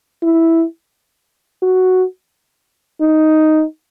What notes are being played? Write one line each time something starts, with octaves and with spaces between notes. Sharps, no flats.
E4
F#4
D#4